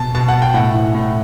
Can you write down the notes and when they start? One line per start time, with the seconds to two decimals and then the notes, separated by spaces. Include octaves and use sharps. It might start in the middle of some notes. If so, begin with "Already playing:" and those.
Already playing: B2 A5
0.15 B2 A5
0.28 F#5
0.42 G5
0.54 A2 F#5
0.74 E3
0.95 A2